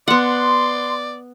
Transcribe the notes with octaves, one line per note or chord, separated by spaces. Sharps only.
B3 D5 F#5 C6